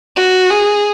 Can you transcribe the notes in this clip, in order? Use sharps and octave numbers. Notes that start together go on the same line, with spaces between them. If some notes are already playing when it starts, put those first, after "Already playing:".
F#4
G#4